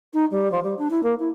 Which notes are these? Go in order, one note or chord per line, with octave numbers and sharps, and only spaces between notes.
D#4
G3
F3
G3
D4
E4
A#3
E4